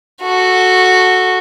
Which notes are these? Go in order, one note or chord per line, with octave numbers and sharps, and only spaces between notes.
F#4 A4